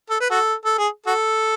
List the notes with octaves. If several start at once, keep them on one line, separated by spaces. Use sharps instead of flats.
A4
B4
F#4 A4
A4
G#4
F#4 A4